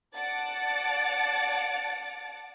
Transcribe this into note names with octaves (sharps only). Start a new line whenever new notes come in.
D5 F#5 A5 A6 C#7 D7